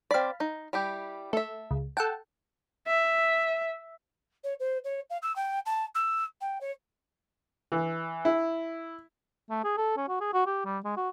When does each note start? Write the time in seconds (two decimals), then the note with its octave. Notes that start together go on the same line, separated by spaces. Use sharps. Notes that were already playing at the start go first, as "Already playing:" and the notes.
0.11 C4 D5 F5 B5
0.40 D#4
0.73 G3 E4 G4
1.33 A3 A4 E5
1.71 C#2
1.97 A4 F#5 G5 A5
2.87 E5
4.44 C#5
4.60 C5
4.84 C#5
5.10 F5
5.22 E6
5.36 G5
5.66 A5
5.95 E6
6.41 G5
6.61 C#5
7.72 E3
8.25 E4
9.50 A3
9.64 G#4
9.78 A4
9.97 C#4
10.09 F#4
10.21 G#4
10.34 F#4
10.46 G4
10.65 G3
10.85 G#3
10.97 F#4